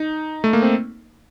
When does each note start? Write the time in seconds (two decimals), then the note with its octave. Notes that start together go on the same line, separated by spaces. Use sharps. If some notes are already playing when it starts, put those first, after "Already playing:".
Already playing: D#4
0.44 A3
0.53 A#3
0.62 C4